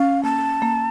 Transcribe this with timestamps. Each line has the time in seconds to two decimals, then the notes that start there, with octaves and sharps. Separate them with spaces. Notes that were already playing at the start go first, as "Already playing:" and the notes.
Already playing: C#4 F5
0.24 A#3 A5
0.62 A#3